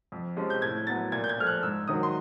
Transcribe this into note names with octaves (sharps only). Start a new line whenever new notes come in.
F2
C3 F3 G#3 C#4
G6
A2 G#6
F#3 B3 A6
A#2 G#6
G6
G#6
F3 A3 F6
F#6
G#2 E6
D#3 F#3 D#6
C6